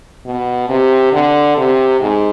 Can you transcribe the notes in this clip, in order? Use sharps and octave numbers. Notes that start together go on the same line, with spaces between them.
B2
C3
D3
C3
G#2